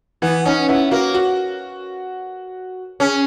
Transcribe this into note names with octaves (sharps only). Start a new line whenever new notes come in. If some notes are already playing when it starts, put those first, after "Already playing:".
E3 B3
C#4 D#4
B3 E4
A#3 F#4
F#4
C#4 G#4